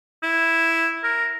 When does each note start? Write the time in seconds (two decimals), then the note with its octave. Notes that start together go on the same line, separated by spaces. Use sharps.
0.23 E4
1.03 A#4